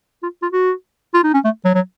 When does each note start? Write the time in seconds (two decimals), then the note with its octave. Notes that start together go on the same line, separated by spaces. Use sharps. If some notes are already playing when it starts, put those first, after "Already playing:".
0.23 F4
0.42 F4
0.53 F#4
1.14 F4
1.24 D#4
1.34 C#4
1.44 A3
1.65 F#3
1.75 F#3